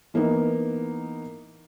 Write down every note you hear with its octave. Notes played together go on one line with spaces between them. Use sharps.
E3 A#3 B3 D#4